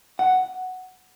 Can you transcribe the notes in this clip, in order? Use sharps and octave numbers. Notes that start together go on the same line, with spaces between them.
F#5